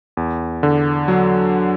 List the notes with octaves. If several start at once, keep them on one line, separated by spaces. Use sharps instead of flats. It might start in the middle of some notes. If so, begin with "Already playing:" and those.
E2
D3
F#3